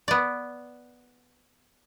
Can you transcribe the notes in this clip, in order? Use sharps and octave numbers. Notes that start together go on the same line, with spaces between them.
B3 D5